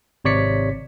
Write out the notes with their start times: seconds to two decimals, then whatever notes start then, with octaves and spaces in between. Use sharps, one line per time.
0.25 G#1 C3 C#5 D5 B6 C#7